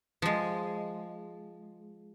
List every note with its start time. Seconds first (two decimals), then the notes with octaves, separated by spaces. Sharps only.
0.22 F3 G#3